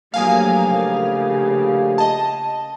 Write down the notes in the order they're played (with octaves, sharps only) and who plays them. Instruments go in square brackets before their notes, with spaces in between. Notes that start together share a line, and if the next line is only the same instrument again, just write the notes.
[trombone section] A#1 A3 G4 [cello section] F#3 A#3 [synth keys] F5 G#5 D#6
[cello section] C#3
[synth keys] D#5 A5